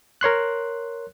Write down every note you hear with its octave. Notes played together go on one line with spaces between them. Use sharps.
A#4 C#5 C6 F#6